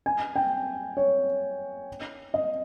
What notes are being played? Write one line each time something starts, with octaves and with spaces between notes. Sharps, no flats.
G#5
G5
C#5
D#5